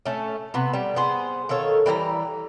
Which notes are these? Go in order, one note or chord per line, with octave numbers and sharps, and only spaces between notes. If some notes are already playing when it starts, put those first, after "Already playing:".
A3 C#4
C3 B3
G3
B3 G#4 C5
D#3 F4 A4 C#5
E3 G3 D5 A#5